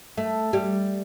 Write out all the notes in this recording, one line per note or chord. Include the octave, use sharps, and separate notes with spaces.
A3
G3